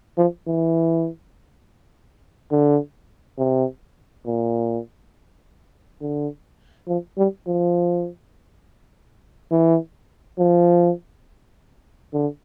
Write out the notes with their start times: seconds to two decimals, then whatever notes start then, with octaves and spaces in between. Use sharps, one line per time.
0.18 F3
0.47 E3
2.52 D3
3.38 C3
4.26 A#2
6.01 D3
6.88 F3
7.18 G3
7.47 F3
9.51 E3
10.39 F3
12.13 D3